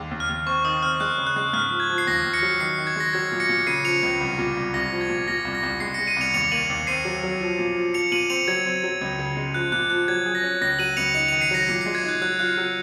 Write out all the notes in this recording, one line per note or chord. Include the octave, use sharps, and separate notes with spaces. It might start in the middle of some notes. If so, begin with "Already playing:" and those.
Already playing: D#2 G#3
D#2
F6
D#2
C4 C#6
D#3 D#6
C4 F6
G#3 F#6
C#3
F#6
G#3
G#2 F6
F3
G#6
F3
C7
D#2 A#6
D#2
A#6 C#7
F#3
D#3 C7
D#3
G#6
G#3 A#6
F#3 G#6
A#2
A#6 C#7
A#2
C#3 C7 D#7
F3 C#7 F7
C#2
C2
A#2
C2
C2 A#6
F3
G#6
A#2
A#2 A#6
C2
A#6
C2
G#3 C7
G#3 A#6 C#7
C7 D#7
C2 C#7 F7
D#2 C#7 F7
A#3 D#7 F#7
D#2
C4 C7 D#7
F#3
F#3
F3
A#2
F3
F3 C#7 F7
A#2 D#7 F#7
C4 C#7 F7
F#3 G#6
C4
F#3
C#2
C#3
G#3
F3 F#6
A#2 F#6
F3 F#6
F#3 G#6
G#4
A#6
C#4
C#2 A#6
F#3 D#7 F#7
C#2 C#7 F7
D#4 C#7 F7
D#3 C#7 F7
C7 D#7
F#3 A#6 C#7
A#2 C7
C7
G#3
G#6
D#4
F#6
F#3 F#6
F4 F#6
F#3